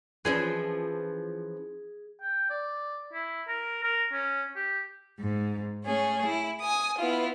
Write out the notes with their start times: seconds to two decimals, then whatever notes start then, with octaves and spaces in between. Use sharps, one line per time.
0.25 E3 F3 C#4 G#4
2.22 G5
2.50 D5
3.13 E4
3.48 A#4
3.83 A#4
4.13 C#4
4.56 G4
5.20 G#2
5.84 A3 C#4 G#4
6.25 E4
6.59 G#5 D#6
6.98 B3 E4 F4